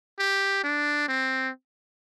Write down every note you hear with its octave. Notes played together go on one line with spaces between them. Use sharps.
G4
D4
C4